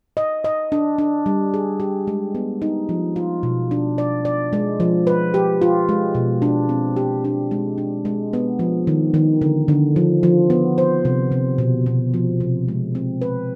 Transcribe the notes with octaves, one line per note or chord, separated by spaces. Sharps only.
D#5
D#5
D4
D4
G3
G#4
G4
G#3
B3
D#4
F3
F4
B2
D4
D5
D5
G#3
F3
B4
G4
F4
G#3
B2
D4
C4
G4
D4
G#3
D4
G#3
B3
F3
D#3
D#3
D3
D3
F3
F3
B3
C5
C3
C3
B2
B2
F3
C3
G#3
C4
B4